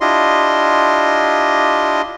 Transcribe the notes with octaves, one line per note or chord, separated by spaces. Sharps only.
D4 E4 F4 G4 D#5 C6